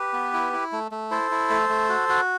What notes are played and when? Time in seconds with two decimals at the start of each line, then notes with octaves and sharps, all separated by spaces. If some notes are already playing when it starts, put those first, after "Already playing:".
Already playing: G4 B4
0.13 B3
0.33 E4
0.53 E4
0.72 A3
0.91 A3
1.11 E4 A4 C5
1.31 E4
1.50 A3
1.69 A3
1.89 F#4
2.09 F#4